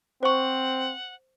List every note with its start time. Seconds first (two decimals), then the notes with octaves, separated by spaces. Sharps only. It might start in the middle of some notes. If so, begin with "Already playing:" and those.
0.23 C4 C5 F#5 C#6